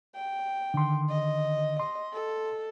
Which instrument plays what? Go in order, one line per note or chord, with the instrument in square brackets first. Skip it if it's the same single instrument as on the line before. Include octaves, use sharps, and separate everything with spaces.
[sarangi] G5
[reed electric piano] D3 D#3 C6
[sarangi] D#5
[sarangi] D#5 [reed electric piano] C6
[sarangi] A4